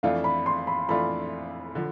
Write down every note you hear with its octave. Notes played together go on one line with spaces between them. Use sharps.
F2 E3 A3 D4 F4 F5
B5
C6
B5
F2 E3 A3 D4 F4 B5
D3 F3